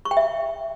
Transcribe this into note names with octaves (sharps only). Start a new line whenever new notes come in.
C#6
G5
E5